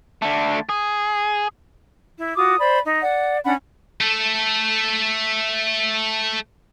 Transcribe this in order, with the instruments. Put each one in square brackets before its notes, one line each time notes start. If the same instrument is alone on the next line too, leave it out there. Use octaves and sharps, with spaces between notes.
[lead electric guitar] D3 A3
G#4
[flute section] E4
F4 F#4 D6 D#6
C5 D5 B5
D#4
D5 F#5
C#4 D4 F#5 B5
[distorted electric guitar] A3 A4